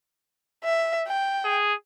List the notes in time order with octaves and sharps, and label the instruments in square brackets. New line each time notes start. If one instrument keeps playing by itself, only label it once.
[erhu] E5
G5
[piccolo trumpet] G#4